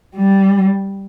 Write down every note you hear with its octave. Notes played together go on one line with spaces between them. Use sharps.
G3